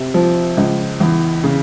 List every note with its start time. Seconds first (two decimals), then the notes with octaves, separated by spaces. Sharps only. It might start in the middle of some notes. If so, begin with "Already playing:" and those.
Already playing: C3
0.14 F3
0.57 C#2
1.00 E2
1.43 C#3